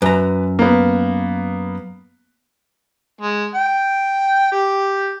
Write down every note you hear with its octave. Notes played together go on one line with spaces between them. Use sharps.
F#2 B4 A#5
A#3 B3
G#3
G5
G4